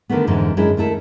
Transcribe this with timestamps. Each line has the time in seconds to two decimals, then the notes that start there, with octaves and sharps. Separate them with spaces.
0.10 D3 D#3 F#3 A3 B3
0.27 F2 G#2 D3 E3 D4 D#4
0.57 F#2 G#3 D4 E4
0.77 D#2 A3 E4 A4